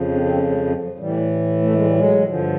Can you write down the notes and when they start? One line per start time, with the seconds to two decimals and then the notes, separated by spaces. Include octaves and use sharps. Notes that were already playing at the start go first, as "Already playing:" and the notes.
Already playing: F2 C#3 F3
0.14 C4 D4
0.25 C4
0.36 B3 C#4
0.51 F#3 G#3
0.67 F#3
0.83 F#3
0.99 A2 E3 G3
1.62 A3
1.74 G#3
1.84 G3
1.96 F#3 G#3
2.25 G2 D3 F3